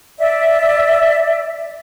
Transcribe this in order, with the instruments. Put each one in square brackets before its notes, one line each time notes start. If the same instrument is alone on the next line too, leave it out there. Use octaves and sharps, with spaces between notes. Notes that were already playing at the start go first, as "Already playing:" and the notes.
[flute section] D5 E5